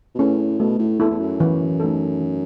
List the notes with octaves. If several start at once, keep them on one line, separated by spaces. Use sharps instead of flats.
B2
A2 A3 C#4 G#4 B4
B2 A3
A2
E2 E4 A4
E2
F#2
E3
A3 D#4 A4
E3